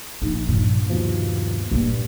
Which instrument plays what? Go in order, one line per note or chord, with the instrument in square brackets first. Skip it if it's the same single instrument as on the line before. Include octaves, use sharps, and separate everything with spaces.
[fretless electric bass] A#1 [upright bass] D#4
[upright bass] G2 A#2
[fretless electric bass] D#2 B2 F3
[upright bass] A#1 A#3 [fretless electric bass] G2